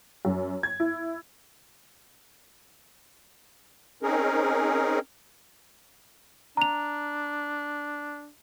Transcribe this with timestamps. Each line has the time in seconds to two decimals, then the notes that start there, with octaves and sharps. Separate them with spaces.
0.25 F#2
0.63 G#6
0.80 E4
4.03 C4 C#4 D#4 G#4 A#4
6.57 D4 A#5 F7